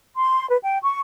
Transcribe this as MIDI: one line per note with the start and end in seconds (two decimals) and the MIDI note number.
0.17 0.47 84
0.49 0.57 71
0.63 0.78 79
0.83 0.99 85